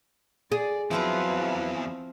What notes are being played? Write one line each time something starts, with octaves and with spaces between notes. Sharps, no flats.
G#4 D5
E2 F3 F#3 C4 E4 F4 B4